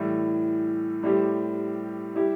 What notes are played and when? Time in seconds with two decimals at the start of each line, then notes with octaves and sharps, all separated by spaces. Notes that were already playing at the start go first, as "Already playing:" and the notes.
Already playing: A2 E3 G3
1.03 A2 G3 C4 G4
2.15 G3 E4 G4